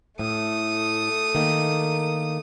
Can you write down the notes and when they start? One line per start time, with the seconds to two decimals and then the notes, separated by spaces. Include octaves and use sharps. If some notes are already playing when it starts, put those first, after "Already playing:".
0.19 A2 A3 D#6
1.35 D#3 A#3